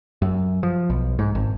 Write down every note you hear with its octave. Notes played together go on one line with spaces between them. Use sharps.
F#2
F3
B1
G#2
G#1